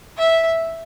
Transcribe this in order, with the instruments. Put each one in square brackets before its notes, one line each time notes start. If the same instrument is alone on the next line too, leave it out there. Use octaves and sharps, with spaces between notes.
[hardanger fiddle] E5